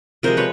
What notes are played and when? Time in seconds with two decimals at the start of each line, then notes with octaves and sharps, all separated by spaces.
0.23 C3 F3 G#3 A#4 C5
0.37 B4 C#5